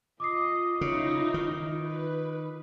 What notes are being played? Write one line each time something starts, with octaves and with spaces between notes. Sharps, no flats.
F4 D#5 D6 D#6 C7
C#3 D#4 E4
D#3
B4